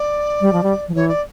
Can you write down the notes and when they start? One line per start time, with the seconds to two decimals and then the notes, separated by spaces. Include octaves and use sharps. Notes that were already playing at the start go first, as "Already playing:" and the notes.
Already playing: D5
0.41 G3
0.53 F3
0.63 G3
0.88 F3
0.94 E3 C#5
1.08 D5